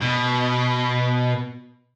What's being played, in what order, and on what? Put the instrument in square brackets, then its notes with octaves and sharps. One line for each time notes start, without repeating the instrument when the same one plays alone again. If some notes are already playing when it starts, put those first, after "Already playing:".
[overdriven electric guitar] B2